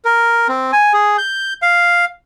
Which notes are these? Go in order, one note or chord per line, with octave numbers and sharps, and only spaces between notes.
A#4
C4
G#5
G#4
G6
F5